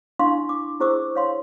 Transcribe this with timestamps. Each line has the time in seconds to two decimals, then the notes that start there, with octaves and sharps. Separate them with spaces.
0.19 D4 E4 F5 C6 C#6
0.49 D6
0.80 E4 G#4 C5 C#6 D6 E6
1.16 C#5 F5 C6